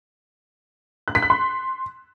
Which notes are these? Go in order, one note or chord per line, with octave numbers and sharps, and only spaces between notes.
F#6
B6
F#6
C6